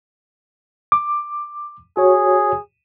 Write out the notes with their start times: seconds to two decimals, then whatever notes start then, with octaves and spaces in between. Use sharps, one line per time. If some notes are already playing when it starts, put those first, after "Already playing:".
0.92 D6
1.97 F#4 G#4 C#5